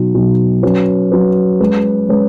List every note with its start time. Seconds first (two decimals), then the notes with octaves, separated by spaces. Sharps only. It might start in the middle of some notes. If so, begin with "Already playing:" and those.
Already playing: B2 F#3 D#4
0.15 B2 F#3 D#4
0.63 F#3 C#4 B4
1.12 F#3 C#4 B4
1.60 G#3 C#4 B4
2.09 G#3 C#4 B4